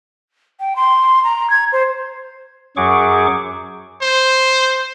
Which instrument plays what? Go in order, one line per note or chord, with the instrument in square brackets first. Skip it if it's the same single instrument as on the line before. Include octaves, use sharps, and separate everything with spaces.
[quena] G5
C6
A#5
G#6
C5
[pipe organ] F#2 F#3 G#4 C#6 D6
[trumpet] C5